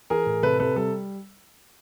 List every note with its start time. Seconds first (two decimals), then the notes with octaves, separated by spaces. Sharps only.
0.10 E3 G#4 A#4
0.26 A2
0.43 C3 A4 B4
0.60 C3 A4 B4
0.76 G3 A4